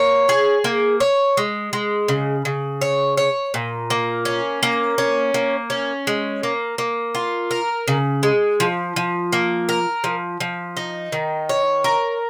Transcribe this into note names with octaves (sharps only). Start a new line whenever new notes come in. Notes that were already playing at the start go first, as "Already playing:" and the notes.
Already playing: A#3 C#5
G#4
A#3
C#5
G#3
G#3
C#3
C#3
C#5
C#5
A#2
A#3
C#4
A#3
C#4
A#3
C#4
G#3
A#3
A#3
F4
A#4
C#3
G#3
F3
F3
A#3
A#4
F3
F3
D#4
D#3
C#5
A#4